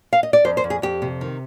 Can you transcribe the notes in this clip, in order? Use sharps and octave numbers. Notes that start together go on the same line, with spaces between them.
F5
D#5
D5
F2 C5
C5
F2
G#4
F2 G4
C3
D#3